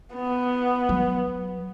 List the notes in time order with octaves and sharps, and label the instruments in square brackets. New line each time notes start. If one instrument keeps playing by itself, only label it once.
[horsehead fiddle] B3
[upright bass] F#3